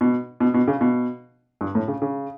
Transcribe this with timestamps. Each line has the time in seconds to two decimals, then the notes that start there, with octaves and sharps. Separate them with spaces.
0.01 B2
0.40 B2
0.54 B2
0.68 C#3
0.81 B2
1.61 G2
1.75 A2
1.88 C#3
2.02 C#3